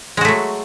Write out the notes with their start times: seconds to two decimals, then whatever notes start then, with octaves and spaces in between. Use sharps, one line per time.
0.17 G#3
0.21 F#4
0.25 A3
0.28 F#3